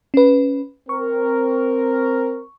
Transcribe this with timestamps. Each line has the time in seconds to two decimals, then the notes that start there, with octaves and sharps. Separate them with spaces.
0.14 C#4 B4
0.89 C4 A#4 C#6